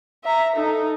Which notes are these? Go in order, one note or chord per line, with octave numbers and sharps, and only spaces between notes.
E5 A#5
D#4 A4